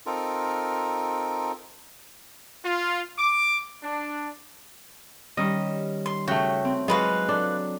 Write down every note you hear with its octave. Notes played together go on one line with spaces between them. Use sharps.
C4 D#4 F4 A4 A#4
F4
D6
D4
D#3 G3 C#4 D#5
C6
C#3 A3 F#4 G5
C4
F#3 G#3 F4 F#4 B4 F5
D4 A4